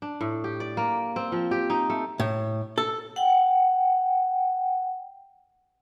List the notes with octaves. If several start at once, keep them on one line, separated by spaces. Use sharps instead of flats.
D4
A2
G4
D5
A#3
C4
F3
G4
D#4
A3
A2
A4
F#5 G5